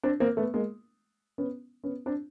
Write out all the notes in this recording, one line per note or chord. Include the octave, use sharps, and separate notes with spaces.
C4 D4
A#3 C4
A3 B3
G#3 A#3
B3 C#4
B3 C#4
C4 D4